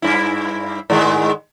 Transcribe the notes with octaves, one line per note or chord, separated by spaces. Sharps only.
G2 E4
G#2 D#3 G#3